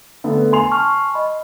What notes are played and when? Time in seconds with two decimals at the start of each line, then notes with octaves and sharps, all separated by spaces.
0.24 D3 A3 B3
0.52 G#5 C6 F7
0.71 A5 C#6 F6
1.14 D#5 B5